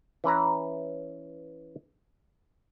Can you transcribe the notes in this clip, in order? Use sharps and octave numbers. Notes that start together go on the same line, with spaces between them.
E3 C#4 B4 A#5